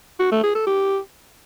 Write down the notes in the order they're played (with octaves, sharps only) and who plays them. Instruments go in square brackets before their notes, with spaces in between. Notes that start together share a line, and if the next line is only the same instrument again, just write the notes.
[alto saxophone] F#4
A3
G#4
A4
G4